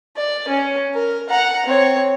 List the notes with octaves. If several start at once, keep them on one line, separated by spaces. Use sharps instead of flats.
D5
C#4
A#4
F#5 A#5
C4 C#5